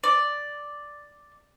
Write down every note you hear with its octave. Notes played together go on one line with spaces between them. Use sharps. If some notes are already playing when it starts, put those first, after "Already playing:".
D5